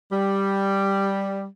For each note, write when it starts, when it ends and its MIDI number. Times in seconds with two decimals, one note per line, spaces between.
0.12 1.45 55